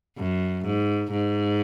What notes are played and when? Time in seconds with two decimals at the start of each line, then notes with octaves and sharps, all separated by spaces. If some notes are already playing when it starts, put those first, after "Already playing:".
0.18 F#2
0.65 G#2
1.12 G#2